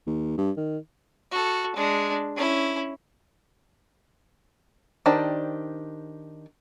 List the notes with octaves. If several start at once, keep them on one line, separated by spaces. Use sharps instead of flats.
D#2
G2
D#3
F#4 A4
G#3 D4
C#4 E4
D#3 D4 G4 C5 D5